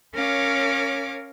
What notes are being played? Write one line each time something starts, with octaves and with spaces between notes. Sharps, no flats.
C#4 A#4 C#5 F5 D6